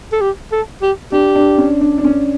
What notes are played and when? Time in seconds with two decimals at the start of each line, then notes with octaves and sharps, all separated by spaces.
0.12 A4
0.21 G4
0.52 A4
0.82 G4
1.12 D4 G4
1.35 D4
1.58 C#4
1.81 D4
1.98 D4
2.04 C#4